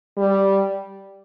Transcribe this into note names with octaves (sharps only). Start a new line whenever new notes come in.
G3